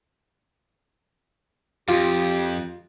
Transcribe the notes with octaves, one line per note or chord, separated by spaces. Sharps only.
F2 F4 G4